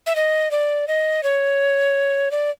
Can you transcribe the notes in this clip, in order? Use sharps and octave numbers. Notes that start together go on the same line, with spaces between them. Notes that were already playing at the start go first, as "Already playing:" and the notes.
E5
D#5
D5
D#5
C#5
D5